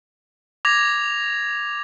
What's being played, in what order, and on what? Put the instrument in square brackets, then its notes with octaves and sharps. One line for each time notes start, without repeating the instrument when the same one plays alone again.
[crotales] D6 G#6 A#6 F7